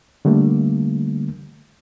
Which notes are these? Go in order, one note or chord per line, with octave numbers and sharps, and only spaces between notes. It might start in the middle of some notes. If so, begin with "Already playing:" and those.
D3 G3 A3 A#3